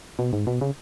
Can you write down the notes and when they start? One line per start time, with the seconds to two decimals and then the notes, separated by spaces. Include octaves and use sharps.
0.19 B2
0.33 G#2
0.47 B2
0.61 C#3